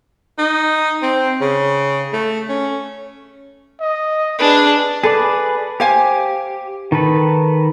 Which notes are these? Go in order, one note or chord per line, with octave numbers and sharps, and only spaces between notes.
D#4
C4
C#3
A3
C#4
D#5
D4 G#4 B4
G#4 A4 B4 D5
G4 C5 F5 G#5
D#3 A4 B4